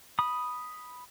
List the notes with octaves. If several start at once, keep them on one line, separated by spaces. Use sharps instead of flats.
B5 D#6